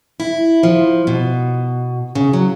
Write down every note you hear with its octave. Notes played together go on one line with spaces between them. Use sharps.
E4
F3
B2
C#3
F#3